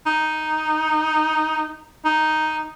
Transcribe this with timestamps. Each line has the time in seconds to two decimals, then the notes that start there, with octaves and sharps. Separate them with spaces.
0.06 D#4
2.05 D#4